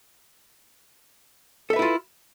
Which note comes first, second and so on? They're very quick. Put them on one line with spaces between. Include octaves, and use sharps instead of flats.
A4 E5 B4 E4 F4